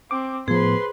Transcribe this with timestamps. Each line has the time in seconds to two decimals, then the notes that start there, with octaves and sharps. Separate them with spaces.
0.11 C4 D6
0.48 A2 F3 B3 G#4 B4 C5 C6